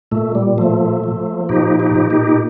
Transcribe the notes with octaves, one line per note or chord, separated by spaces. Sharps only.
A#2 A3
G3
F3 A3
F3
A#2 D#4 G4
D#4 G4
A#2
D#4 G4